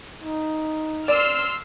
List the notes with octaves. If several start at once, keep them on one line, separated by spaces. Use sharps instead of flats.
D#4
D5 C6 E6 F6